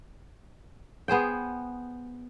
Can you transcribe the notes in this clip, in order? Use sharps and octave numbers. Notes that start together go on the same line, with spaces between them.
B3 G#4 C5 G5